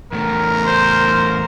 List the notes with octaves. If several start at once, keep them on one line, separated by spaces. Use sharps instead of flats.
E2 A2 A3 A#4
C5